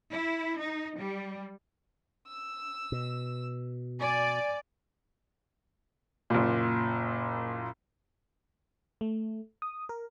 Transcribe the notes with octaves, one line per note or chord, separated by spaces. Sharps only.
E4
D#4
G3
E6
B2
D5 G#5
F#1 A#2
A3
D#6
A#4